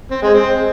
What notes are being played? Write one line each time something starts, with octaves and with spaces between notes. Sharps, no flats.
C4
G#3
C4